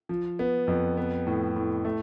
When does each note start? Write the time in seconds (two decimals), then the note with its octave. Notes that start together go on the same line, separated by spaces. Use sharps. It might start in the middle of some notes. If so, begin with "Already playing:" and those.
0.09 F3
0.39 B3
0.68 F2
0.97 B3
1.27 A2
1.56 A2
1.85 A3